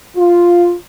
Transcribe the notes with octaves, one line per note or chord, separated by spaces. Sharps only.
F4